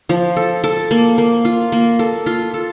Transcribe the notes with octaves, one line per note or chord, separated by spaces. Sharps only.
F3
A4
A4
A#3
A#3
F4
A#3
A4
F4
A4